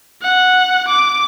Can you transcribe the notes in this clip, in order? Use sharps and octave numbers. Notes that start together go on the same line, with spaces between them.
F#5
D6